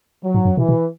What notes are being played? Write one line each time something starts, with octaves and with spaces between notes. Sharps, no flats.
F#3
G#2
F#2
B2 E3
B2